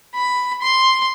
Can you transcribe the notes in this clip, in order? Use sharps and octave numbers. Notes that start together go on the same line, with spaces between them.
B5
C6